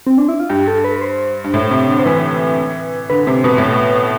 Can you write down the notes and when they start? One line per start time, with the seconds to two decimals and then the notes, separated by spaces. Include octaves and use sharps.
0.07 C4
0.18 D4
0.29 E4
0.40 F4
0.49 G2 G4
0.68 A4
0.84 B4
0.96 B4
1.01 C5
1.44 G2
1.54 A2
1.71 C3
1.88 D3
1.99 C5
2.05 E3 B4
3.10 D3 B4
3.27 C3 C5
3.44 B2 B4
3.58 A2
3.71 B2